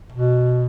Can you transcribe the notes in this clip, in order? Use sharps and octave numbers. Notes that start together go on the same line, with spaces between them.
B2